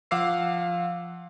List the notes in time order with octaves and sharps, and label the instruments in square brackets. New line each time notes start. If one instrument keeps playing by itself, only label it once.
[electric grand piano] F3 F5 F#5 D6 E6 C7